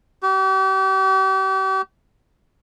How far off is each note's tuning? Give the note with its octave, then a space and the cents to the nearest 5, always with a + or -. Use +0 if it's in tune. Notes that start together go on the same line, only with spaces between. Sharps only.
G4 -40